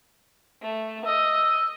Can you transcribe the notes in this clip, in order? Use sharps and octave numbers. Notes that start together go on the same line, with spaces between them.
A3
D#5 E6